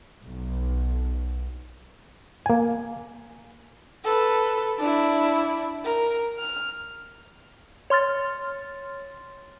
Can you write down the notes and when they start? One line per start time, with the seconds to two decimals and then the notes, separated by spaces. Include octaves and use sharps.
0.23 B1
2.46 A#3 G#5
4.05 A4 B4
4.79 D4 E4
5.85 A#4
6.39 F6
7.90 C#5 C6 F6 A6